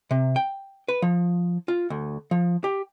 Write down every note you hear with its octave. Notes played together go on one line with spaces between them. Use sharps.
C3
G5
B4
F3
F4
D2
F3
G4